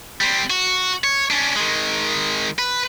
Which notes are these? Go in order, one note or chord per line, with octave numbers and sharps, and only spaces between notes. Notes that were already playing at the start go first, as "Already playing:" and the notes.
G3 C4
F#4
C#5
C#4 D4
D#3 G#3
B4